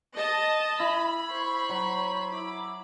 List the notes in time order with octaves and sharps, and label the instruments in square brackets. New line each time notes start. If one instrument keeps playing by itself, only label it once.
[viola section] D#5 A5
[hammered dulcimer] E4 [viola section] B5
[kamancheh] C5 C#6
[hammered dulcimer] F#3
[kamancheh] E4 D6